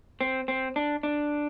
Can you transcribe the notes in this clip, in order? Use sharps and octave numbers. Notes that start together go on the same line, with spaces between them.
C4
C4
D4
D4